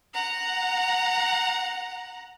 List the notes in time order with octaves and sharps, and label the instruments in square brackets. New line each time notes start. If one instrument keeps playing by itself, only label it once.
[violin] F#5 A#5